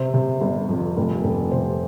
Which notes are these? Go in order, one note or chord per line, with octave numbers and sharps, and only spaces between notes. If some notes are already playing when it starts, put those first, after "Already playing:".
Already playing: C3 C5
C3
G1
F2
F1
F1
C3 C5